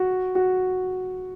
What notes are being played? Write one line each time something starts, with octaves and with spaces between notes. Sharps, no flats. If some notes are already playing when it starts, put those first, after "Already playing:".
Already playing: F#4
F#4